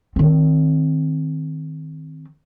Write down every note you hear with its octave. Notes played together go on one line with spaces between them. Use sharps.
D#3 C4